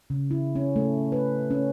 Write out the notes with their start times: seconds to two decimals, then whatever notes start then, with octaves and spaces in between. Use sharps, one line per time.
0.10 C#3
0.31 E4
0.56 C#4
0.76 A3
1.12 B4
1.51 C#4